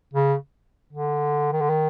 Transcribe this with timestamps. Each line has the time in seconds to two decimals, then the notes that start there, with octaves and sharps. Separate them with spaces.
0.13 C#3
0.93 D3
1.52 D#3
1.61 D3
1.69 D#3